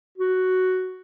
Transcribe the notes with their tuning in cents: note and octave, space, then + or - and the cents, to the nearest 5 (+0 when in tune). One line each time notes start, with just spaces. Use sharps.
F#4 +5